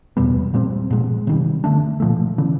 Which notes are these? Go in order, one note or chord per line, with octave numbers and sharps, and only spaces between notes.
E2 B2 G3 B3
A#2 G3 C4
A#2 F3 G#3
C3 D#3 G3
D3 F#3 A3 D4
A#2 F3 A3
C#3 E3